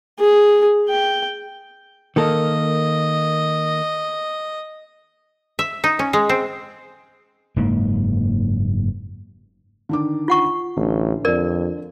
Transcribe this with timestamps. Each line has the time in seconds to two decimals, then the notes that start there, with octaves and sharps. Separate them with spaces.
0.19 G#4
0.89 G5
2.16 D#3 A#3 A4 D#5
5.59 E5
5.84 D#4
5.99 C#4
6.13 G#3
6.29 C4
7.56 F#1 G#2 A#3
9.89 D3 D#3 D6
10.28 F4 F#5 C#6
10.77 A1 D3
11.25 F2 A#4 D5